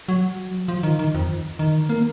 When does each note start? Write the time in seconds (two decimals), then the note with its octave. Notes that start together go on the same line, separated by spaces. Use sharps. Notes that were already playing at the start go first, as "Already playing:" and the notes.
0.09 F#3
0.68 F3
0.83 D#3
0.99 D#3
1.15 F2
1.59 D#3
1.89 A#3